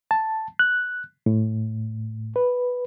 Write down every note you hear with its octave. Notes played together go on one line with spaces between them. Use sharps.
A5
F#6
A2
B4